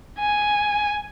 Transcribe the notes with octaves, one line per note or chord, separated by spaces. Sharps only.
G#5